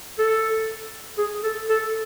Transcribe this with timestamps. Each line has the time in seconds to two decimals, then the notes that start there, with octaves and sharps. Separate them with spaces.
0.19 A4
1.18 G#4
1.43 A4
1.69 A4